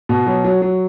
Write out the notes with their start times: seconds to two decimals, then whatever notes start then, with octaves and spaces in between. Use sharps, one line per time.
0.09 B2
0.27 F#3
0.45 F#3
0.62 F#3